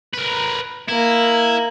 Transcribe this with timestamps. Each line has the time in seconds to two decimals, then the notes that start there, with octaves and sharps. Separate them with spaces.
0.14 A#4 B4
0.89 A#3 E4